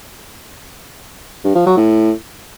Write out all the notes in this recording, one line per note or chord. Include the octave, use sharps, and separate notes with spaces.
G2
F3
F#3
A2